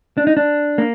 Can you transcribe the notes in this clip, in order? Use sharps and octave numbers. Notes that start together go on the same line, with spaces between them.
D4
D#4
D4
A#3